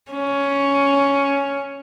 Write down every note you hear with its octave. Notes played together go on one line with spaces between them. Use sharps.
C#4